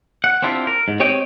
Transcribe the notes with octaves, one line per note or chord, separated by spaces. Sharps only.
F#5
C4 D4 E4 F4 G4
A#4
G#2
C4 G4 C#5 D#5 G5